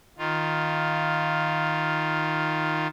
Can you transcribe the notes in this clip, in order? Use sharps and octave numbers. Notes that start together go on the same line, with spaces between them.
D#3 F4